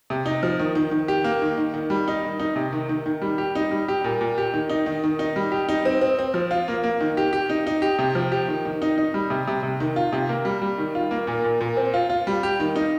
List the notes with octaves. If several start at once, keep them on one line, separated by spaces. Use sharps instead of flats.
C3
D#4
F3
D#3
D#3
D#3
G4
A#3
D#3
D#3
D#3
G3
D#4
D#3
D#4
C3
D#3
D#3
D#3
G3
G4
D#4
G3
G4
A#2
A#2
G4
D#3
D#4
D#3
D#3
D#4
G3
G4
D#4
C4
C4
C4
F3
F4
A#3
A#3
D#3
G4
G4
D#4
D#4
G4
C3
F3
G4
D#3
D#3
D#4
D#4
G3
C3
C3
C3
D#3
F4
C3
A#3
G3
G3
D#3
F4
A#3
A#2
A#2
A#2
C4
F4
F4
G3
G4
D#3
D#4